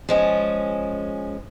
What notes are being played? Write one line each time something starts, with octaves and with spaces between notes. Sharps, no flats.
F3 G#3 C#4